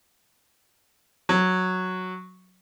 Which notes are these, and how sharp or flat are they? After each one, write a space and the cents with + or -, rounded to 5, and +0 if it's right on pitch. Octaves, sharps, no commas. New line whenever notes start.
F#3 -5